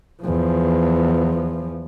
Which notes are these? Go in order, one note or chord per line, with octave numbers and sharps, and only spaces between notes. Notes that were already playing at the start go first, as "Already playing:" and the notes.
E2 F3